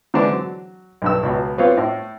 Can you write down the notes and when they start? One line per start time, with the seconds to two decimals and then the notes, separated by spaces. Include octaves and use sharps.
0.14 D3 E3 G#3 C4 D4
0.32 F#3
1.02 B1 G2 E6
1.23 C#2 B2
1.58 G3 B3 C4 F4 C#5 F5
1.77 A2